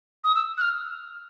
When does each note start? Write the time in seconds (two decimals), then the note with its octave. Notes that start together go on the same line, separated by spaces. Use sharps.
0.24 D#6
0.35 E6
0.58 F#6
0.61 F6